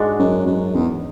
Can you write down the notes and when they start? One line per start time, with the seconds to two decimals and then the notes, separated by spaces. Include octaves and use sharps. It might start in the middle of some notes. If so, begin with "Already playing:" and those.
Already playing: G#2 G#3 D4 F#4
0.20 F#2
0.47 F#2
0.75 E2